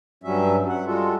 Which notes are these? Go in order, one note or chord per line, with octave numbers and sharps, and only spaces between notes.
G2 F#3 G3 C#4 E5
F#5
G3 G#3 F4 F#4 A4